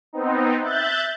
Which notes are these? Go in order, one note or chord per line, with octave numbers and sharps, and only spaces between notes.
B3 C4 D#4
E5 F#6 G6 A6